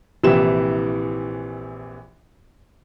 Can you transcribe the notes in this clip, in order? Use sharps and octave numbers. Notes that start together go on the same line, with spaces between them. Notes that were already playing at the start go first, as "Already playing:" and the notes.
A#1 C3 E3 E4 G4 E7